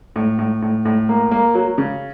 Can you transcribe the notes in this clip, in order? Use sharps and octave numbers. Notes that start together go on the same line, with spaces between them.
A2
A2
A2
A2
A#3
A#3
F#3
C#3